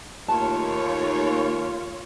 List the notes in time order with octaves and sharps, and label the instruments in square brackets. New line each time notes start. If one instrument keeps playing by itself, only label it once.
[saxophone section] D#2 [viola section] A3 C#5 [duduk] F4 [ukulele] A5